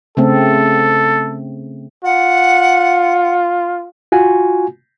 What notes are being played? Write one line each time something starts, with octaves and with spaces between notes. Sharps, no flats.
C#3 A3 C4 A4
F4 F#5
F4 F#4 G#5